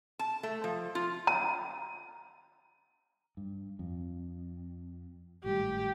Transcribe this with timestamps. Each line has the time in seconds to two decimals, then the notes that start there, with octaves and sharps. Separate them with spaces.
0.19 A5
0.43 A3
0.64 F3
0.95 F4
1.27 A#5
3.37 G2
3.79 F2
5.44 G#1 A2 G3 G4